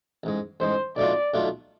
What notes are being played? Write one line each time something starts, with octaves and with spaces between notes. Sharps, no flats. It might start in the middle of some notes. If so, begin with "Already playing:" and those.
A1 G#2 G#3
A1 G#2 G#3 C5
B1 B2 A3 D4 F4 D5
B1 B2 A3 D4 F4